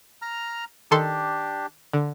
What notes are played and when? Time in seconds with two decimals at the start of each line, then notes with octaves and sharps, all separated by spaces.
0.22 A#5 F6
0.91 D#3 D4 G4 A4 C6
1.93 D3